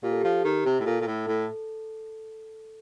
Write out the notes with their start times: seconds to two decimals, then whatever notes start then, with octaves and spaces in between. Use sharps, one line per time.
0.03 A#2 G4
0.12 A4
0.21 F3 G4
0.45 D#3 G4
0.66 C3
0.80 A2
0.86 A#2 A4
1.01 A#2
1.07 A2
1.28 A2